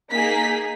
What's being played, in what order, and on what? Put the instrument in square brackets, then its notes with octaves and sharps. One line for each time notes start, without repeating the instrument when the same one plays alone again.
[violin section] A#3 D#4 G#4 B6